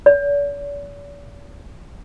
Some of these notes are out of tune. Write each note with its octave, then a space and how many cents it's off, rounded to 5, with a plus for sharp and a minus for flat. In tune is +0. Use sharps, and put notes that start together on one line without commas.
D5 -45